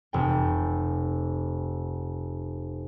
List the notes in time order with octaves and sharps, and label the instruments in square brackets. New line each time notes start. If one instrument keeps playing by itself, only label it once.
[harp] F1 G5